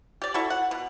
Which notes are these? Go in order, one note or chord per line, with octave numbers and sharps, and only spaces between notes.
G4 D5
E4 F#4 A4
F#5
B2